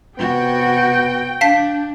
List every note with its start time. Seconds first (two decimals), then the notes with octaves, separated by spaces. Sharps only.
0.19 C3 B3 F#4 G5
1.41 D4 F5 A5 B6